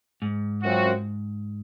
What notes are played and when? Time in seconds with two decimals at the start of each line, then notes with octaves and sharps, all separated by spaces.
0.22 G#2
0.62 F#2 F3 C4 F#4